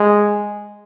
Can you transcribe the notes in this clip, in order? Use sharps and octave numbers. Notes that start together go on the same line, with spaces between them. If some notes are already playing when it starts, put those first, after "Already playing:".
Already playing: G#3